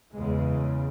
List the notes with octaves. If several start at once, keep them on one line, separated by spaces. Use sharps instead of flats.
E2 C#3 G#3